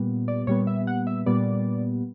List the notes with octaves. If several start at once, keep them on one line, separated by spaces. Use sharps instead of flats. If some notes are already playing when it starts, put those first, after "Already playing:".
Already playing: A#2 G3 B3
D5
A#2 G3 B3 C#5
E5
F#5
E5
A#2 G3 B3 D5